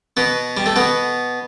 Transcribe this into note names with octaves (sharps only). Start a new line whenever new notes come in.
B2 B3
G3
A3
B2 B3